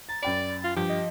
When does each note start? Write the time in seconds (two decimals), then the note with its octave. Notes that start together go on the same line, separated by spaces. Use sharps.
0.09 A#5 A6
0.23 F#2 D5 G5 B5
0.64 F4
0.76 G2 F3 G4
0.89 D#5